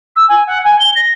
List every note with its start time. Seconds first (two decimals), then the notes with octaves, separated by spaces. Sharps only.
0.16 E6
0.29 G#5
0.47 F#5
0.64 G#5
0.79 G7
0.95 A#6